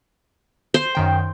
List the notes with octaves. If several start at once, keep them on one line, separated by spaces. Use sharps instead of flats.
C5
F#2 D#3 G5